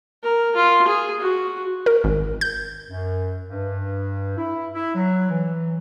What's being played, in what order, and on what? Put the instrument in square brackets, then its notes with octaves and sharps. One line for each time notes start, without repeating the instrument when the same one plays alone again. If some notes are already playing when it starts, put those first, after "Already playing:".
[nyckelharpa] A#4
F4
G#4
F#4
[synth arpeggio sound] A#4
G#1
G6
[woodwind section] F#2
G2
E4
E4
F#3
E3